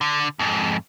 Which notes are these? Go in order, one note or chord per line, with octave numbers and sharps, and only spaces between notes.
D3
F2 G#2